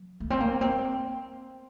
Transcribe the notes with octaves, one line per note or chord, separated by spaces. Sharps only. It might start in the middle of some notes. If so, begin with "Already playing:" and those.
Already playing: F#3
A3
C4
A#3
C4